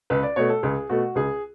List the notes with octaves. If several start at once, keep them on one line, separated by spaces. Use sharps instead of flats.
C#2 B4
D5
B2 A3 C#5
A4
C#2 G#4
B2 A3 F#4
C#2 G#4